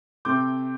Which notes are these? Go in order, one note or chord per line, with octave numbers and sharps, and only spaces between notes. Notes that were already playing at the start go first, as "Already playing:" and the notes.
C3 A3 C4 D6 G6